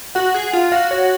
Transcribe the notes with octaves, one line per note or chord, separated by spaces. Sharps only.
F#4 F#5
G#4
F4
F#4 F5
C#5